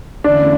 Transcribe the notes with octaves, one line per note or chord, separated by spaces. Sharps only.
E2 D3 A3 C#4 D4 E4